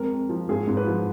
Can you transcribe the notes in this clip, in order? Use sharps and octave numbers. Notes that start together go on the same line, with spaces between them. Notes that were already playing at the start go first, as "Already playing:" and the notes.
Already playing: F2 G#3 A#4
F2
F3
G#2 G#4
G#2
B4
F3